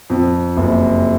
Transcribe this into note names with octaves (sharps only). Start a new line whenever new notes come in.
F2
F#1